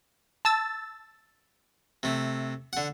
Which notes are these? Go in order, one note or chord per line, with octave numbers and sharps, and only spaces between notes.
A5 E6 A6
C3 A3
D3 F#5